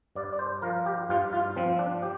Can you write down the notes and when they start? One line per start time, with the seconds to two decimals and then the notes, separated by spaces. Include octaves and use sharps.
0.15 G2 D5
0.33 D5
0.39 C5
0.62 F3 A#4
0.86 G4
1.09 G2 F4
1.33 F4
1.56 F3 C4
1.79 D4
2.02 G4